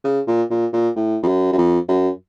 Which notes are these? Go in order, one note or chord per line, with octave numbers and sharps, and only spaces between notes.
C#3
A#2
A#2
A#2
A2
F2
F#2
F#2
F2
F#2